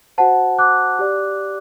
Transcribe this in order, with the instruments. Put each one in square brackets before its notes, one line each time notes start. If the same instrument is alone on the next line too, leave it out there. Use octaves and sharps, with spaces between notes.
[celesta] F#4 C5 F#5 A5
D6 F#6
G4 D5